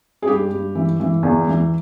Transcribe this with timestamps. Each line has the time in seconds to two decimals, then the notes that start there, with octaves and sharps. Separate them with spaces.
0.22 G#4
0.27 G2 G4
0.51 G2
0.75 E3
1.00 E3
1.23 E2
1.47 E3